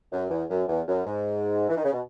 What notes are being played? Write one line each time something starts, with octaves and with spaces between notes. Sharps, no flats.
F#2
E2
F#2
E2
F#2
G#2
E3
D#3
C#3
B2